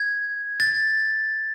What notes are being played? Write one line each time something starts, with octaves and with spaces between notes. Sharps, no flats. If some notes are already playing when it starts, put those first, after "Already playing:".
Already playing: G#6
A6